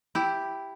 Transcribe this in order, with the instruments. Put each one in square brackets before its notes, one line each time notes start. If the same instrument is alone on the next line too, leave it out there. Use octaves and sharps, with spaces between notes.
[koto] E4 G4